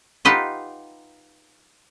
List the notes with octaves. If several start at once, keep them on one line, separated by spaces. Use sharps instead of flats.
D#4 F4 G4 B4 D#5 F#5